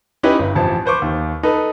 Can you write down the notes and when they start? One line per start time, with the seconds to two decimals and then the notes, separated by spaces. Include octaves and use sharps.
0.23 C#4 D#4 E4 G4 B4
0.39 G1
0.55 A1 F2 A5
0.85 B4 C5 C#6 D6
1.02 D#2
1.43 D#4 A4 B4